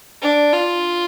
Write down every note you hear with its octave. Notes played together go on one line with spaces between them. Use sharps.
D4
F4